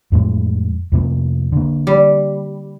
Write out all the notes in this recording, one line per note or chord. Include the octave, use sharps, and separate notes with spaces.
F2 A2 G#3
F2 C3 A#3
D3 A#3
G3